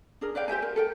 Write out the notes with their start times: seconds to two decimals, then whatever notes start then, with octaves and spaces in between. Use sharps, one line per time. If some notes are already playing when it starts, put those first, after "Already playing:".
0.21 D4 G#4 A#4
0.35 B4 D5 F5 G5
0.48 G4 C5 E5 G#5
0.62 A#4
0.76 A4 A#4 G5